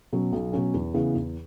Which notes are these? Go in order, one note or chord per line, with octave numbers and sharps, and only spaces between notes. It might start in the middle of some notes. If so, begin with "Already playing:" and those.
B2 F#3 C#4
B1
B2 F#3 C#4
E2
C#3 E3 B3
E2